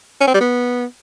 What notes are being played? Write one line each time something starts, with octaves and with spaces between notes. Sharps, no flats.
C#4
C4
G3
B3